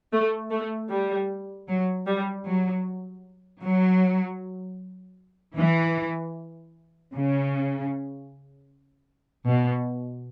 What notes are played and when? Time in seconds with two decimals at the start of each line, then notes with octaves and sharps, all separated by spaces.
0.13 A3
0.51 A3
0.90 G3
1.68 F#3
2.07 G3
2.46 F#3
3.63 F#3
5.57 E3
7.13 C#3
9.46 B2